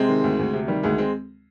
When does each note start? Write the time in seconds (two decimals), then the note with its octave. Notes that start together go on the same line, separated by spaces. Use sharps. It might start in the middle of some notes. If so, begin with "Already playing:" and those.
Already playing: C3 G#3 C4
0.09 D#3
0.24 D2
0.39 D2
0.53 C3
0.68 D#3 G3
0.83 D2 G#3
0.98 G#3 C4